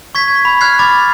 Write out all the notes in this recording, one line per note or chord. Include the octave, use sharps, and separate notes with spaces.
C#6 G#6 B6
G#6
B5
F6 F#6 G#6 C7
B5 D6 A6